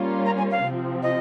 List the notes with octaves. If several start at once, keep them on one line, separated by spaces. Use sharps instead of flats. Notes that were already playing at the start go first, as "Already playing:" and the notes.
Already playing: G3 A#3 C#4 F4
A#5
G#5
F5
C3 F3 C4
D#5